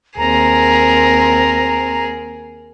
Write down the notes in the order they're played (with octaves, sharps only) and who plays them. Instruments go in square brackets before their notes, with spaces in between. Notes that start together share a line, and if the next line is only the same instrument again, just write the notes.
[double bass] D#2 C4 [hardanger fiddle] G#4 A#4 [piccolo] A#5